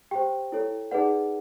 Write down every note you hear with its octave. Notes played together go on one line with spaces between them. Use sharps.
G4 C5 G5
E4 A4 C#5
D#4 G#4 B4 D5 F#5